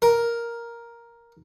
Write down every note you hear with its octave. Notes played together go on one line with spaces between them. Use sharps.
A#4